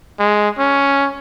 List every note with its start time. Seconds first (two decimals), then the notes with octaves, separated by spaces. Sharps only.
0.19 G#3
0.58 C#4